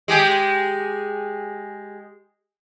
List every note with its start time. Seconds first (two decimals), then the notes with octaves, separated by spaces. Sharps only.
0.08 G#3 G4 G#4